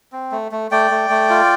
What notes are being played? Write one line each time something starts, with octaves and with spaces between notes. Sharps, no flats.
C4
A3
A3
A3 D5 G5
A3
A3
F4